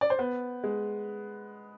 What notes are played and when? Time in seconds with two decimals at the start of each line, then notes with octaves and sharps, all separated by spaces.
0.01 D5
0.10 C5
0.19 B3 B4
0.64 G#3